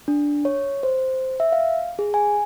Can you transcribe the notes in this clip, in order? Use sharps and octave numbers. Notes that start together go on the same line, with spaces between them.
D4
C#5
C5
E5
F5
G#4
G#5